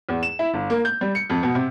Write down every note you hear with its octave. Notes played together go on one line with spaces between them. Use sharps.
E2
E7
E4
G1
A#3
G6
G3
C#7
F2
B2
C3